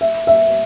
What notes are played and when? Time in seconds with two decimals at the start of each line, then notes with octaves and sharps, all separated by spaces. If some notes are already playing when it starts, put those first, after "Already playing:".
0.01 E5
0.27 E5